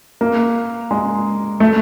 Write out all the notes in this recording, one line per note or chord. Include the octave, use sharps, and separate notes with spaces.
A#3
G#3
A3